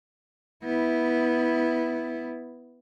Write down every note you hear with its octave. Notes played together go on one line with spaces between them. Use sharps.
B3 E4